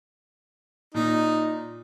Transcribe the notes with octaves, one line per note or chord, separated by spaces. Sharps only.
A#2 D#4